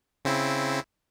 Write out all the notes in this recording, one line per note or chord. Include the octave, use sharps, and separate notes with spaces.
C#3 C4 E4